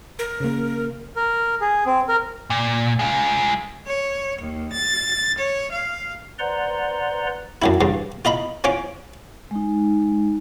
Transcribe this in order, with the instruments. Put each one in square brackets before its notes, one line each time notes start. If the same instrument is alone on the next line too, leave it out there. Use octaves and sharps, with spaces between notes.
[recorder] A#4
[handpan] C#3 A#3
[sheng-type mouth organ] A#4
G#4
C4
A#4
[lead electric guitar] A#2
G#3 F4
[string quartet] C#5
D#2
A6
C#5
F5
[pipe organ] B4 C5 D5 F#5 A#5 C6
[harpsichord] F#2 F#3 E4
G2 C#3
F4 D#5 A#5 B5
C#4 F4 C#5 D6
[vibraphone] G#3 D#4